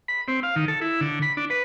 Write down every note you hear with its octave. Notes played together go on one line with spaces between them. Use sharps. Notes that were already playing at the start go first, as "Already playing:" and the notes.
B5
C4
F5
D#3
A4
E4
D3
B5
D4
B4